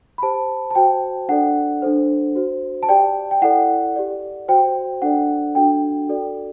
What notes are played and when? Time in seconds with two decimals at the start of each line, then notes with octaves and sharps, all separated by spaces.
0.18 B5
0.22 G4 C5 A5
0.71 A5
0.75 F#4 C5 G5
1.29 D4 A4 D5 F#5
1.82 D4 A4 C5
2.35 F#4 C5
2.83 A5
2.89 G4 D5 G5
3.31 G5
3.42 E4 A4 D5 F#5
3.96 G4 D5
4.48 F#4 C5 G5
5.02 D4 A4 D5 F#5
5.55 D4 F#4 A4 G5
6.09 F#4 A4 D5